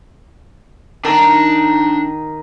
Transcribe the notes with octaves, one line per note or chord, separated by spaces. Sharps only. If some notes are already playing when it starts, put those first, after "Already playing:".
D#3 D4 A5